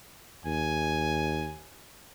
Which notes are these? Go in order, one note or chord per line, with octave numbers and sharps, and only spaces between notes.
D#2 G#5